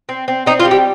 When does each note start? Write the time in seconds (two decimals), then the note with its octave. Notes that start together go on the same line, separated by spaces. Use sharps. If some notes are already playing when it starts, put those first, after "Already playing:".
0.09 C4
0.28 C4
0.46 C4 D#4
0.60 F4
0.65 G3
0.71 G4